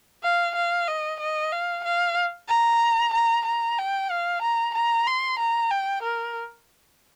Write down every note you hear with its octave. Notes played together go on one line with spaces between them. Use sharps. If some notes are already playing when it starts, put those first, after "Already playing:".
F5
F5
D#5
D#5
F5
F5
A#5
A#5
A#5
G5
F5
A#5
A#5
C6
A#5
G5
A#4